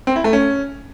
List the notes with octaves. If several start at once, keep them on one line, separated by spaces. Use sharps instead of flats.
C4
E4
A3
C#4